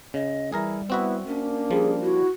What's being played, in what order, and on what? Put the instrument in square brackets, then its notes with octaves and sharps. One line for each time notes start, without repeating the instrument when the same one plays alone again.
[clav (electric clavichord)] C#3 [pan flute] D#5
[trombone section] E3 E4 [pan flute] G3 [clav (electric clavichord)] G#4 A#4 A#5
[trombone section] B3 E4 [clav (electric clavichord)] C4 F#4 E5
[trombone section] A#3 D4 [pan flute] C#4
[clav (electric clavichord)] F3 G3 [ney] G#4
[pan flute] E4 [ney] F#4